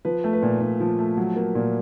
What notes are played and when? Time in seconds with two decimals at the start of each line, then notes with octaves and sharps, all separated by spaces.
0.05 F3 B4
0.24 A3
0.33 B4
0.43 A#2
0.61 A#2
0.80 F3
0.99 A3
1.17 F#3
1.36 A#3
1.55 A#2